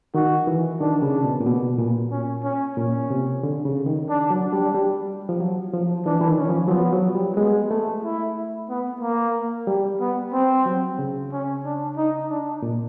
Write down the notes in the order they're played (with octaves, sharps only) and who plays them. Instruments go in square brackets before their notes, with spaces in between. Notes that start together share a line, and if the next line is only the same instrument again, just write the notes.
[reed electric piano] D#3 [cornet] F#4
[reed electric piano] E3
[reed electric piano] D#3 [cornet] D4
[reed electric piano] C#3
B2
A#2
B2
A#2
[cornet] C#4
C#4
[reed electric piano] A#2 [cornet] C#4
[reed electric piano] C3
D3
C#3
D#3
[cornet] D4
[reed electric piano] F#3
[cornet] D4
[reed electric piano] G3
G3
F3
F#3
F3
[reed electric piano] E3 [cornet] D4
[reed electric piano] E3
D#3
[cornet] C#4
[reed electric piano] F3
F#3
[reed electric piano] F3 [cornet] B3
[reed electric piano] F#3
G3
[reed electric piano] G#3 [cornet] B3
[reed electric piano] A3
[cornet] E4
B3
A#3
[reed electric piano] G3
[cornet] B3
C4
[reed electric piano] F#3
C#3
[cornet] C#4
D4
D#4
D4
[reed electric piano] A#2